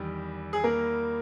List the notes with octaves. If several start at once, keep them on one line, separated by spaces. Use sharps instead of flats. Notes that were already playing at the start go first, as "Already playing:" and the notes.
Already playing: E2 D#3 G3 G4
G#4
A#3 A#4